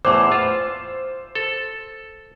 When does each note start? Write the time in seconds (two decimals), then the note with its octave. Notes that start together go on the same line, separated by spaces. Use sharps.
0.05 E2 A2 E3 C5 D6 E6
0.32 F4
1.35 A4